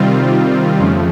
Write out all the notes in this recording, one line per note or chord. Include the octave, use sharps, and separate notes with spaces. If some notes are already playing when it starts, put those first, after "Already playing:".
Already playing: C3 D#3 G3 C4 F4
F2 C#3 F3 A3